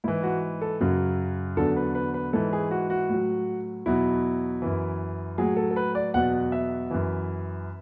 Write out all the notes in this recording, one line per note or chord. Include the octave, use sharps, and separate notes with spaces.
G#2 E3 E4
F#4
A4
F#2 C#3 F#3
E2 D3 F#3 A4
B4
B4
B4
G#2 E3 A4
G#4
F#4
F#4
A2 F#3
E2 B2 F#3 E4
F#2 E3
A2 F#3 G#4
A4
A4
B4
D5
E2 B2 F#3 F#5
E5
F#2 E3